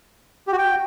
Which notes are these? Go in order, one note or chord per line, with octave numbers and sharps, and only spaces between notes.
G4
F#4
G5